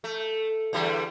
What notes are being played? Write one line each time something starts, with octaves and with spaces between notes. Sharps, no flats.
A3
E2 D3 G3